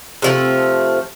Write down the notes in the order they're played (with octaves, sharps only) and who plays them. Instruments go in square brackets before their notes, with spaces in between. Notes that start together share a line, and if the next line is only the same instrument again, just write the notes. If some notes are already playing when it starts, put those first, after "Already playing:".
[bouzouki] C3 F3 A3